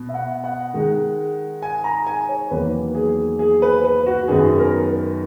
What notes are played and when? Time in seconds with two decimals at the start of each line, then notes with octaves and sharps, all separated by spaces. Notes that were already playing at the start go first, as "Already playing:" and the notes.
Already playing: B2
0.09 E5
0.14 F#5
0.44 F#5
0.74 D#3 G#3 D#4
1.62 G#5
1.84 A#5
2.07 G#5
2.29 C#5
2.51 E2 D#3 F#3 A#3 B4
2.95 G#4
3.39 G#4
3.62 B4
3.84 B4
4.06 F#4
4.28 F#2 D#3 F#3 B3 G#4
4.58 A#4
4.88 A#4